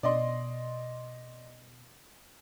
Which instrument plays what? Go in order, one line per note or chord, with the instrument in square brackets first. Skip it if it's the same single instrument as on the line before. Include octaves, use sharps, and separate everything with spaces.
[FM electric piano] B2 [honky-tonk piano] D5 D#5 C6